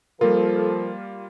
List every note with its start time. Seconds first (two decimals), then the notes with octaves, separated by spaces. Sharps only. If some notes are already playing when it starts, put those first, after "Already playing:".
0.21 F3 G3 A#3 F4 A4 A#4